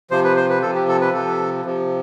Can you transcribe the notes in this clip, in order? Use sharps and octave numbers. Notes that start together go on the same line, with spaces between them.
C3 F3 C5
B4
C5
B4
C3 F3 A4
G4
A4
B4
C3 F3 A4
C3 F3